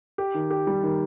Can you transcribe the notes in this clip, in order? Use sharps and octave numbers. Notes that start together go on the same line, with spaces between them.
G4
D#3
G4
G3
D#3